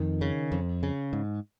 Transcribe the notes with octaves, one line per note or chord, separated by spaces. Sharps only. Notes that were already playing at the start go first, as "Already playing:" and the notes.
Already playing: F2 D#3
C#3
F2
C#3
G#2